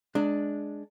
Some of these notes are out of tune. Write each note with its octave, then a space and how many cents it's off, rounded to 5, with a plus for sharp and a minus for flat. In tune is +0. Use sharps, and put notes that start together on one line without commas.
G#3 +10 D4 +0 A#5 -40